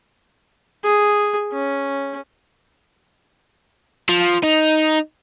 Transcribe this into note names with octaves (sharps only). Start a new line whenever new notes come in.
G#4
C#4
F3
D#4